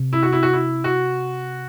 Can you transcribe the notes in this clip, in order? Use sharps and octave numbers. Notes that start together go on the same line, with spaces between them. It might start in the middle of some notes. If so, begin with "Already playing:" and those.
Already playing: C3
E4
F#4
E4
F#4
E4
F#4